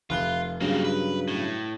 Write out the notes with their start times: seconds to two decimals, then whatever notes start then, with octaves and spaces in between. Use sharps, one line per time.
0.10 F1 F4 F#6 G7
0.61 G2 C#3 F#3 A#3 C4
0.84 B4
1.28 A2